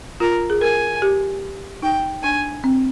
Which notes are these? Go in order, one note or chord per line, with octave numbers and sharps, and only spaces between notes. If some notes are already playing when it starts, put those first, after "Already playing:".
F4 A#4
G#4
A#4 G#5
G4
D#4 G5
D4 G#5
C4